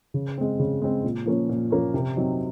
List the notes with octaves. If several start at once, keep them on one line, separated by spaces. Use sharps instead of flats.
C#3
G#3 C4
C#3
G#3 C4
A#2
F3 A#3 C#4
A#2
F3 A#3 C#4
C3
F#3 C4 D#4